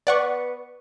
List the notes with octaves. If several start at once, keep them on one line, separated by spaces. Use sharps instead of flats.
B3 D5 F#5 C#6